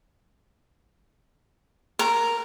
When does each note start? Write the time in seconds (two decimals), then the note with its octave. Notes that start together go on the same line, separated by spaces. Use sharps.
1.99 A#4